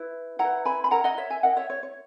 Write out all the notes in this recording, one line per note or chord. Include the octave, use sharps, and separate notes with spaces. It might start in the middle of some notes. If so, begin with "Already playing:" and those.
Already playing: E4 B4
E4 B4 F#5 A#5
G#5 B5
B5
E4 A#4 F#5 A#5
D#5 F#5
C#5 E5
E5 G#5
E4 A#4 D#5 F#5
C#5 E5
C#5
C#5